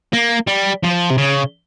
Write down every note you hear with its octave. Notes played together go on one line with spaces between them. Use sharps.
A#3
G3
F3
C3
C#3